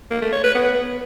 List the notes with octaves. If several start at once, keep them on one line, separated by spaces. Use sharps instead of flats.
A#3
A3
C#5
B4
B3